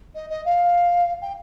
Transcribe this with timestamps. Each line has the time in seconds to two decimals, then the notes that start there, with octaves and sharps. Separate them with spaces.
0.14 D#5
0.30 D#5
0.45 F5
1.21 G5